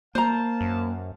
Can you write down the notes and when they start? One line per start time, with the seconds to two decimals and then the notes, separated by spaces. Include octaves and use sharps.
0.15 A#3 C5 F5 A5 A#5
0.61 F#2